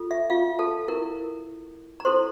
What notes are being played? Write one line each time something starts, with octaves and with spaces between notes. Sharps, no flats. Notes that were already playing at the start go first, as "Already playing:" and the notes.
Already playing: F4 A4
E5
F4 F5
A4 A5
E4 A#4
A#5
E4 A4 C5 C6